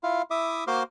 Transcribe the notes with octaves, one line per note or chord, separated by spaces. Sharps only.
E4 F4 F5
E4 E5 D6 D#6
A#3 F#4 C5 C6 D6 F6